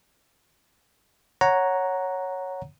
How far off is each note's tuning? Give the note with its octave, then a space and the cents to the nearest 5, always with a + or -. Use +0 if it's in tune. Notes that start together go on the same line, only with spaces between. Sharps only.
C#5 +0 F#5 +0 A#5 +0